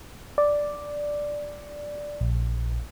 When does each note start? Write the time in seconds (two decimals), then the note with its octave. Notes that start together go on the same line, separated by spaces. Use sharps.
0.38 D5
2.21 A#1